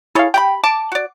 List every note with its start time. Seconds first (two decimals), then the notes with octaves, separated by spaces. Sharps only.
0.15 E4 G#4 A4 C#5 F5
0.34 G4 F#5 G5 B5
0.64 A5 D6
0.92 F#4 D5